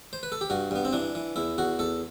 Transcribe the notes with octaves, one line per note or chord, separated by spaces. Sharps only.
C5
B4
A4
G4
G2 F#4
G2 B3
C4
E3 D4
E3
E2 E4
E2 F#4
E2 A4